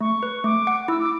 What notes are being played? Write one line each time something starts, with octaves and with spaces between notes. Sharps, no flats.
A3 C#6
B4
A3 D6
F#5
E4 E6
D6